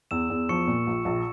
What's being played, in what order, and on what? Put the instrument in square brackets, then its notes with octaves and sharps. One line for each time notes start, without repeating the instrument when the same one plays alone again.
[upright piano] E2 [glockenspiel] E6 E7
[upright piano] E2
[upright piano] F3 [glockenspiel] C#6 C#7
[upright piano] A#2
A#1
A#1